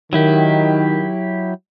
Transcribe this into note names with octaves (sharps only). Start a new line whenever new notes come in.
D#3 F#3 E4 G4